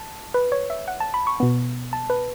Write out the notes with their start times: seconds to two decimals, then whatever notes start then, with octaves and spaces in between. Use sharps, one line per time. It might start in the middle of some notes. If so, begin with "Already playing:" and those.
Already playing: A5
0.34 B4
0.52 C#5
0.70 E5
0.88 F#5
1.00 A5
1.14 B5
1.27 C#6
1.40 B2 B3
1.93 A5
2.10 B4